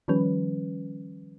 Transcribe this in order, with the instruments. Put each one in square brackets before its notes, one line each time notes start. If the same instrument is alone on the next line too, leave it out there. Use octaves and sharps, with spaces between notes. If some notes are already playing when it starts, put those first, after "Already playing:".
[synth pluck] D#3 F3 G3 C#4 B4